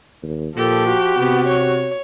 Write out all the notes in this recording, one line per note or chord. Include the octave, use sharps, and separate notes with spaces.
D#2
A#2 F3 G4 A4
F#4
C3 B3
C#5